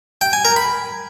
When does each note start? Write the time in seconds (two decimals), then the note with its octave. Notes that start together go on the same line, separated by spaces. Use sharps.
0.21 G5
0.33 G#5
0.45 A#4
0.56 B5